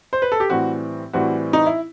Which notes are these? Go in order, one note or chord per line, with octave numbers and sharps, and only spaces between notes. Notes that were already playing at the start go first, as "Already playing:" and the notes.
C5
B4
A4
G4
A2 E3 G3 C4 F#4
A2 E3 G3 C4 F#4
D#4
E4